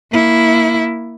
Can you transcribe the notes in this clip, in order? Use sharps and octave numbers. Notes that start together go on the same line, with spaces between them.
A#3 E4